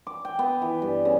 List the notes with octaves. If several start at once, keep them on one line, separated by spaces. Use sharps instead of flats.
D6
G5
B3
E3
G2
C#3